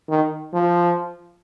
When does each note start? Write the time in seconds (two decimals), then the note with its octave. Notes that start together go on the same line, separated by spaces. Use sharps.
0.09 D#3
0.53 F3